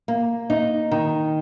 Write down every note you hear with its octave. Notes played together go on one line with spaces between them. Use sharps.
A#3
D#4
D#3